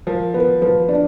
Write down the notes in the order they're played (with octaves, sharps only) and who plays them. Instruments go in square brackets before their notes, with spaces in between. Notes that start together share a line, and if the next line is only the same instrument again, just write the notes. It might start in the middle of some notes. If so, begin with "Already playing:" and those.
[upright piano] F3 [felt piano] A#4
[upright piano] B3 [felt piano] B4
[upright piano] F3 [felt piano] B4
[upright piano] D4 [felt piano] D5